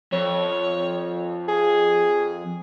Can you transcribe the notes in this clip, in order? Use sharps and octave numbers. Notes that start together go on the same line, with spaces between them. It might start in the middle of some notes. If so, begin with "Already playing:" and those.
F2 C#5
G#4